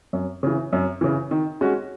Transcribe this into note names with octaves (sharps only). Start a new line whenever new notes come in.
F#2
C#3 E3
F#2
C#3 E3
D#3
G#3 C#4 F#4